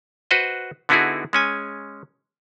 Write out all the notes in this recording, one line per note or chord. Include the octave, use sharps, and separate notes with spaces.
F#4 B4 C5 D#5
D3 B3 D#4 E4 F#4 G#4
G#3 C#4 G#5